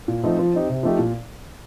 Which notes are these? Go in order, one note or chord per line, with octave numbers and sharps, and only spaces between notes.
A#2
F3 A3 C4 D#4
F3
C4 D#4 G4
C3
F3 A3 D#4 G4
A#2